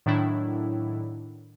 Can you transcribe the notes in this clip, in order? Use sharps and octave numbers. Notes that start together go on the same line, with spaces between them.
A2 D#3 F#3 D4 E4